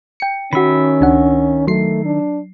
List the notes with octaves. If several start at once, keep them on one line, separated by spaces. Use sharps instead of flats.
G5 C#7
D#3 C#4 F#4 E5 B5
C#2 D4 F#5
F#3 A3 C7
D4